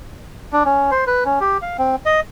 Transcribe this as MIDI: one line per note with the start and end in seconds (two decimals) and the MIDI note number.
0.53 0.63 62
0.65 0.90 61
0.91 1.05 72
1.07 1.24 71
1.25 1.39 61
1.41 1.58 67
1.62 1.77 77
1.79 1.96 60
2.06 2.20 75